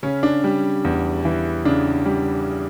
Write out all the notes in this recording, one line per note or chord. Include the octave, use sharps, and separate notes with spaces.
C#3 C#4
D4
G3
E2
E3
C#3 D4
G3